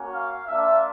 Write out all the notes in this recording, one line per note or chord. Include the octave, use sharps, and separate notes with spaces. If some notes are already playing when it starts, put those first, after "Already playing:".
Already playing: A#3 C#4 F#4
F5
A#3 D4 F4 E5